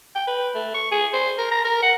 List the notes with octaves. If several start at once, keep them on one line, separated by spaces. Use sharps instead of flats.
G5
B4
A3
C#6
G#4
C5
A#4
A#5
A#4
F#5